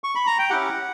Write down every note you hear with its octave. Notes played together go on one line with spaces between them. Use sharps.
C#6
B5
A#5
G5
C#4 E4 G4 F#5